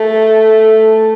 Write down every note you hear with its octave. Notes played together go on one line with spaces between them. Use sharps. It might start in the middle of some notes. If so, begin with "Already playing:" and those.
Already playing: A3